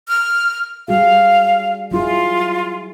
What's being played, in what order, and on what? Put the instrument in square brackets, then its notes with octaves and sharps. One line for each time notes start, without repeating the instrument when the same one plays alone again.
[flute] F6
[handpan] G3 F#4 G#4 [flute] F5
[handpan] F#3 E4 G#4 [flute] F4